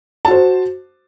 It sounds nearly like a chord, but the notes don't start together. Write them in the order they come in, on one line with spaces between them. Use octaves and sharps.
A5 F#4 C5